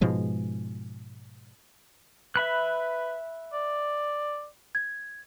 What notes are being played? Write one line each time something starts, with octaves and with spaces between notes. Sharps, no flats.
G#2 B2 F3 G#3
B4 E5 B5 F#6
D5
G#6